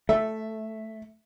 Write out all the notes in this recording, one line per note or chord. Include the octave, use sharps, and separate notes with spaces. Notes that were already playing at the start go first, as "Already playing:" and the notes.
A3 E5